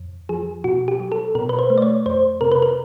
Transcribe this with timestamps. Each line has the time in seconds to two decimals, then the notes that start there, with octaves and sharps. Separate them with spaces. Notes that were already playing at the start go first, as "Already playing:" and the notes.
Already playing: F2
0.29 F3 G#4
0.64 B2 F#4
0.88 G4
1.00 F#3
1.12 A4
1.35 B2 A#4
1.49 B4
1.59 C5
1.70 A3
1.78 D5
1.82 C#5
2.06 F2 C5
2.41 C3 A#4
2.52 B4
2.62 A#4